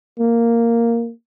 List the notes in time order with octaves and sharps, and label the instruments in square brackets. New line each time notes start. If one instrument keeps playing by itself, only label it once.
[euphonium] A#3